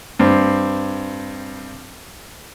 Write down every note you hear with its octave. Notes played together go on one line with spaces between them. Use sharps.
G2 C4